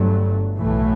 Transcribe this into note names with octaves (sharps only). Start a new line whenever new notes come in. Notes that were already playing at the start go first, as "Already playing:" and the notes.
Already playing: G1 G2 F#3 A3
B1 A2 E3 A3